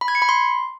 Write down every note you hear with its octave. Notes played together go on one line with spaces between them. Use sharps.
B5
G#6
C#7
B5
C6